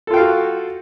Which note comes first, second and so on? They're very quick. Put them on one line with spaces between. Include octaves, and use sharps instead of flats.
A4 F4 G5 F5 F#4